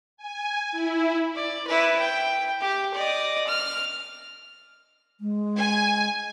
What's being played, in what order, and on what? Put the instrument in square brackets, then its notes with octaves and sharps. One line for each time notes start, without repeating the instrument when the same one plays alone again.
[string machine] G#5
E4
[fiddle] D5
E4 B4
G5
G4
D5 D#5
F6
[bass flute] G#3
[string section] G#5